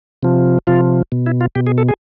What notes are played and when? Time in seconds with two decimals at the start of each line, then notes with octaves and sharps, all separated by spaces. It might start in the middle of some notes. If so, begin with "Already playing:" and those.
0.23 C3 F3
0.67 C3 F3 F4
1.12 B2
1.26 E4
1.41 F4
1.55 B2 G4
1.67 G#4
1.78 A4
1.89 G#4